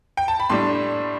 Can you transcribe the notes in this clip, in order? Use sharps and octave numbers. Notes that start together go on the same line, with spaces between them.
G5
A5
B5
A2 G3 D4 C6